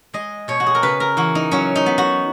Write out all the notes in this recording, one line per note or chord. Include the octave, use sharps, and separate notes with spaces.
G#3 D#5
B2 C#5
F#4
G#4
A#4
C#3 B4
A#4
E3 F#4
D#4
F#3 C#4
D#4
B3
F#4